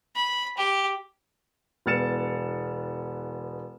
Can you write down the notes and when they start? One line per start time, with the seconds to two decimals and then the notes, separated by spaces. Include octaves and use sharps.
0.16 B5
0.57 G4
1.86 E1 B3 F6 A6 C#7 E7